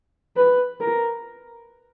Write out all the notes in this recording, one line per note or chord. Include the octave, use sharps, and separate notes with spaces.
B4
A#4